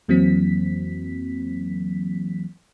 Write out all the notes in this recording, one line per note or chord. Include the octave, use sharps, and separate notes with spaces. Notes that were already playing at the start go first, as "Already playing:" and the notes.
F2 E3 F#3 A#3 C4 B6